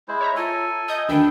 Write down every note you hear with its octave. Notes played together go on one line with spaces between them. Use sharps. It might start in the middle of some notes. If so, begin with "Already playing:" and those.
G#3 E4 C5
C#5 E5 A#5
F4 A4 G#5
D#5 D#6 G6
D2 D#3 D4 A4 G5 B5